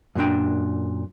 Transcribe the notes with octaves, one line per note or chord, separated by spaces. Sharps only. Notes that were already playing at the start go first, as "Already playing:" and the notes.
F#2 A#2 F3 D4 G5